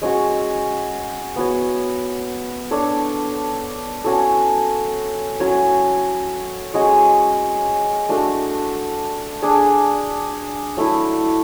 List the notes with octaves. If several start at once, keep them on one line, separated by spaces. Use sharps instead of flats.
G#3 C#4 F#4 C#5
B3 F#4 C#5
D4 A4 C#5
C#4 F#4 A4
F#3 C#4 F#4 C#5
G#3 C#4 F#4
A3 D4 F#4 A4
D4 G#4 D5
F#3 A3 E4